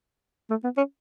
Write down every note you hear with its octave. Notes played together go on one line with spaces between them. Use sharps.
A3
B3
C#4